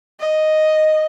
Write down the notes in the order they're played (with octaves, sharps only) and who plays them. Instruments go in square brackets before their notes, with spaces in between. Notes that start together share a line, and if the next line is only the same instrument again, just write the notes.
[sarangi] D#5